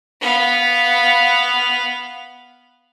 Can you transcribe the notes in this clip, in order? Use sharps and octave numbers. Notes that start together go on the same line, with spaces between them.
B3 F5